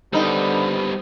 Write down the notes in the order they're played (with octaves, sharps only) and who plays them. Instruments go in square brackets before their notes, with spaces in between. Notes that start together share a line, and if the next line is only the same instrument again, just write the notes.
[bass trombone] D3 [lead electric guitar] G3 B3 [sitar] C4 D#4 [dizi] B5